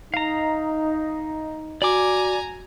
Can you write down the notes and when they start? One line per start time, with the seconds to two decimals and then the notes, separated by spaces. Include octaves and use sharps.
0.14 D#4 F5 A#5
1.82 F#4 D5 G#5 A#5 D6